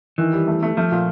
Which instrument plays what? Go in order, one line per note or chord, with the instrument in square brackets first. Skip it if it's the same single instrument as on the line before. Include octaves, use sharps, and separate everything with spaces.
[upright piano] D#3 [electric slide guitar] E3
[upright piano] G3
A3
A3
[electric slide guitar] F3 [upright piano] A3
[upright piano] A#2